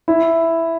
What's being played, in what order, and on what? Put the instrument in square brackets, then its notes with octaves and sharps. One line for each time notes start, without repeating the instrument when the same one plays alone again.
[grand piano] E4